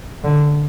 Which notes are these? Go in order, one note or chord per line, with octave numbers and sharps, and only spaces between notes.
D3